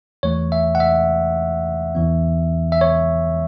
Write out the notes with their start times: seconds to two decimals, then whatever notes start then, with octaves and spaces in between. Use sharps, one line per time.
0.23 E2 E3 A3 C#5
0.52 E5
0.75 F#5
0.80 E5
1.95 E2 E3 B3
2.72 E5
2.81 C#5